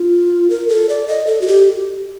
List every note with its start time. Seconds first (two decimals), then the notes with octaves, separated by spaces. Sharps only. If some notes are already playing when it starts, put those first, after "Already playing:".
Already playing: F4
0.50 A#4
0.69 A4
0.89 D5
1.08 D#5
1.27 A4
1.41 F#4
1.47 G4